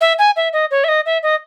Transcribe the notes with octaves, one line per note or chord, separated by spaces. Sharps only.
E5
G#5
E5
D#5
C#5
E5
D#5
E5
D#5